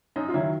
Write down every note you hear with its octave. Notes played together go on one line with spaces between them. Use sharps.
F#2 D#4
F4
D#3 F#3 E4